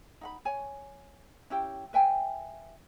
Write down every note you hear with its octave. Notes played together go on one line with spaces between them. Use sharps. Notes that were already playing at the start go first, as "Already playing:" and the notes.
D#4 F#5 B5
C#5 G#5
C#4 E4 G4 G5
B4 E5 G5 G#5